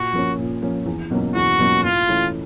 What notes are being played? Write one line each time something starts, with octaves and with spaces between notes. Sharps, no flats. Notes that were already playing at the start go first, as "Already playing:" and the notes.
Already playing: A#2 F#4
F3 A#3 C#4
A#2
F3 A#3 C#4
E2
B2 F#3 A#3 C#4
E2 F#4
B2 F#3 A#3 C#4
A2 F4
E3 A3 C#4 E4